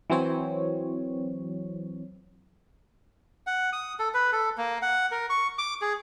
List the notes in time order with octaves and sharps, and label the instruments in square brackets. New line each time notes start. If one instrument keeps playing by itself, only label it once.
[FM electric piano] E3 F#3 C4 C#5
[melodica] F#5
D#6
A4
B4
A4
A#3
F#5
A#4
C#6
D6
G#4